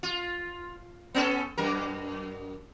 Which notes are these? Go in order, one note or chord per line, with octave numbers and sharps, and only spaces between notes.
F4
B3 C#4 A4
F#2 A#4